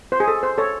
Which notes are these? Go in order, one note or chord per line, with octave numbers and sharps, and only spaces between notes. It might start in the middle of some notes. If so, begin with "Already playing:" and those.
C5
G#4
A4
C5
A4 C#5